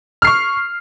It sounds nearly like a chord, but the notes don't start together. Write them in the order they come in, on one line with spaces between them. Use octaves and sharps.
F6 C7 C#6